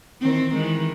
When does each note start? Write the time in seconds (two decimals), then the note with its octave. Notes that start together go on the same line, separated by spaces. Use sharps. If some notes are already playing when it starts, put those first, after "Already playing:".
0.21 D#3 E3 C4
0.54 D#3 E3 G#3